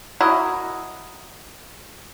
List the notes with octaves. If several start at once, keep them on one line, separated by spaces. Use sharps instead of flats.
E4 F#4 A#4 D#5